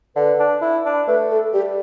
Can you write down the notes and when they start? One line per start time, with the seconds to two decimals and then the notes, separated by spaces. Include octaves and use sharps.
0.16 D3 B4
0.39 D4
0.61 E4
0.85 D4
1.07 A3 B4
1.30 A4
1.53 G3 G4